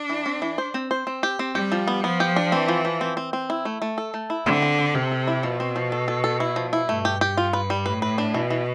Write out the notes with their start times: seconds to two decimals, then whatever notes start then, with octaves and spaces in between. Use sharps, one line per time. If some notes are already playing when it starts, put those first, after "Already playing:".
Already playing: D4
0.10 E3
0.26 C4
0.42 E3
0.58 C5
0.74 C4
0.91 C5
1.07 C4
1.23 G4
1.39 C4
1.55 G3 G4
1.72 F3
1.88 B3
2.04 F3 B3
2.20 G4
2.36 D4
2.52 E3 C4
2.68 F3
2.85 F3
3.01 C4
3.17 C4
3.33 C4
3.50 E4
3.65 A3
3.82 A3
3.98 A4
4.14 A3
4.30 E4
4.46 D3 C4
4.62 C4
4.79 C4
4.94 C3 A4
5.11 A4
5.27 E4
5.43 B2 F3
5.60 C4
5.76 F3
5.92 A4
6.08 A4
6.24 A4
6.40 E4
6.56 F3
6.73 E4
6.88 G2 A3
7.05 G4
7.21 G4
7.37 F4
7.53 B4
7.70 G3
7.86 A2 B4
8.02 B4
8.18 D4
8.34 B2 E3
8.50 E3